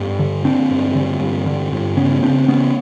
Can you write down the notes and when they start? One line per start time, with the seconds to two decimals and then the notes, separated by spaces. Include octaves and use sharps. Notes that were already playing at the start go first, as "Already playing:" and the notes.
Already playing: G2 B3 C#4
0.19 D3
0.45 D3 C4 D4
0.71 G2
0.95 D3
1.20 G2
1.46 D3
1.72 G2
1.97 C#3 B3 C#4
2.22 C#3 C4 D4
2.48 C#3 B3 C#4